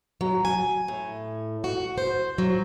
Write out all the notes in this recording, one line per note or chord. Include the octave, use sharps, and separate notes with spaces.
F#3
G#5
A2
F#4
C5
F#3